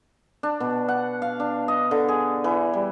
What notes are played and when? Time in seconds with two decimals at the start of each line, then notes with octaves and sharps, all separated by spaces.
0.43 D4
0.60 B2
0.88 F#5
1.22 F5
1.40 D4
1.68 D#5
1.91 D3
2.08 G#4
2.44 E3
2.73 G3